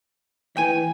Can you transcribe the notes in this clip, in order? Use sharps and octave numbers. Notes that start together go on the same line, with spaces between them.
E3 G5 G#5